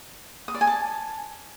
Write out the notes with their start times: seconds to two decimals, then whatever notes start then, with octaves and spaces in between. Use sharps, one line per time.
0.48 D#6
0.54 D5
0.61 G#5
0.67 A5